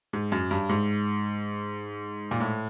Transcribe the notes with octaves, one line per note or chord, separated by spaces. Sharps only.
G#2
F#2
G2
G#2
A#2
A2